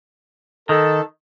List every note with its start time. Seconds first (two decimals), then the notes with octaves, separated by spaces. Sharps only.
0.69 D#3 A4